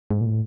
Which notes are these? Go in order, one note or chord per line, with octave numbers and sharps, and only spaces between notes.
G#2
A#2
A2